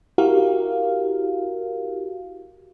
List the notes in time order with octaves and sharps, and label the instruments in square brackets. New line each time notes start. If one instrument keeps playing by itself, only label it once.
[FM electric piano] E4 F#4 G4 A#4 F5